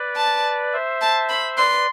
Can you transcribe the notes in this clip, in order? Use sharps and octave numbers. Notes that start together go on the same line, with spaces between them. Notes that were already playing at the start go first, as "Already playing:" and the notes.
Already playing: B4 D5
A5
C5 E5
A5
B5
B4 D5 C6